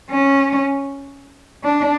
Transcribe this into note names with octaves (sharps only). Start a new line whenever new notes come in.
C#4
D4